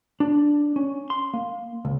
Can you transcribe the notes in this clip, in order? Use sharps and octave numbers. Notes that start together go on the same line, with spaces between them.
D4
C#4
C6
A#3
C#2